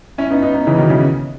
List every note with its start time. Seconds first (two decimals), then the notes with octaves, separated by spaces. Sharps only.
0.18 C#4 E4
0.31 B3 D#4
0.42 B3 D#4
0.54 B3 D#4
0.67 C#3 E3
0.78 B2 D#3
0.90 C#3 E3